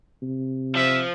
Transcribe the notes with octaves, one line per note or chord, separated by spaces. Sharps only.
C3
F3 E5